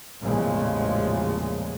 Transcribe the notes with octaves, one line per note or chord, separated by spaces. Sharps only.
A1 E2 A#2 C#3 F3 G#3